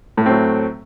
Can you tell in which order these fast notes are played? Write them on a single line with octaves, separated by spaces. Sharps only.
A2 A3 C4 F#3